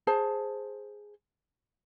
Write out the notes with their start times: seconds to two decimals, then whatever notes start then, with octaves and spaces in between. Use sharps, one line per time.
0.07 G#4 C5 A5